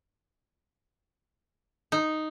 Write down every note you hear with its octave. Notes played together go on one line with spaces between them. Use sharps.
D#4